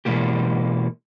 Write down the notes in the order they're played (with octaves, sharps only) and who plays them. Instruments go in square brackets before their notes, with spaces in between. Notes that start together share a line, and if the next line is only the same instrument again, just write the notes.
[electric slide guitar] B2 E3 G#3 A#3 G4